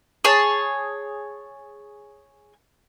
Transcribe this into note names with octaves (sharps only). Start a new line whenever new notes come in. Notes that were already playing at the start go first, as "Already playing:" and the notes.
G#4 C#5 A5